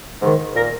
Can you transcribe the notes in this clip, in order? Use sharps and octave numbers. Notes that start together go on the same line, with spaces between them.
G#2 D#3
A#2 A#4